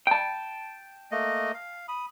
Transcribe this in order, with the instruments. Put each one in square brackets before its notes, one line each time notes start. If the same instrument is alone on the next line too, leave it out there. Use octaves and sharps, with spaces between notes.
[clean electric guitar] G5 A5
[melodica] A3 A#3 D#5
F5
B5 D#6